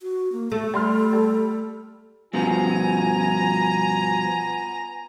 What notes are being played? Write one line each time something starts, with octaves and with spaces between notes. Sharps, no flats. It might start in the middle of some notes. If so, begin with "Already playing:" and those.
F#4
A#3
A3 A4
G3 C6 F6
G3
G2 B2 F3 B3 F4 G#5 A#5